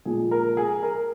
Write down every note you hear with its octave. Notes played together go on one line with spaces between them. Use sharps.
A#2 F3 G#3 G#4
A#4
G#4
A#4